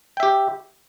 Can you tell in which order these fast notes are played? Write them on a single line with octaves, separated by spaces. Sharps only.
G5 E5 G4